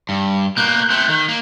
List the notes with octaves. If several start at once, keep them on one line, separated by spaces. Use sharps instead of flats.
G2
B2 A#3 F#6 G6
A3 C4
D#3
A#3